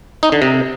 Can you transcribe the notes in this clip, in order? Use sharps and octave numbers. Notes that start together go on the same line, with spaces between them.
D#4
D3
C3